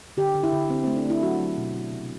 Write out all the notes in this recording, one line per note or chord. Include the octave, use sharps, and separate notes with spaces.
D3 G4
D3
E4
D3
D3 C4
C4
A3
D4
A3 E4
F#3 F#4
F#3
B2
F#3
C3